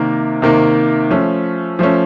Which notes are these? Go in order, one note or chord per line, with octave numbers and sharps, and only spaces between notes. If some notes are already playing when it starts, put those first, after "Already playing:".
Already playing: C3 D#3 A#3
C3 D#3 A#3
F3 A3 C#4
F3 A3 C#4